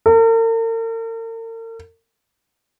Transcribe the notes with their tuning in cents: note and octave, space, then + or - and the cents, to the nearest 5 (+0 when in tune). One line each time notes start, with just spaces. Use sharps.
A#4 -45